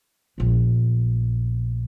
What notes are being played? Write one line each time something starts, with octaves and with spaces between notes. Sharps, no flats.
A#1 B3